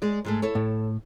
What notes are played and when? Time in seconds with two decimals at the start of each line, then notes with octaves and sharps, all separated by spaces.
0.02 G#3 G#4 D5
0.25 G#2 G#3 A3
0.42 E4 A4 C#5
0.55 A2